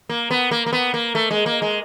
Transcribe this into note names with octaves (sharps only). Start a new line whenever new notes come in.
A#3
B3
A#3
A#3
B3
A#3
A3
G#3
A#3
G#3